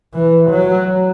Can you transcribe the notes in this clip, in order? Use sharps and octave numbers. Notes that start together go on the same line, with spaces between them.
E3
F#3